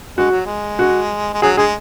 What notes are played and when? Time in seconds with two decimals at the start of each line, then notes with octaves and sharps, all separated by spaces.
0.18 G#3 F#4
0.31 F#3
0.45 G#3
0.79 F#4
1.33 G#3
1.42 F#3 G#4
1.57 G#3 G#4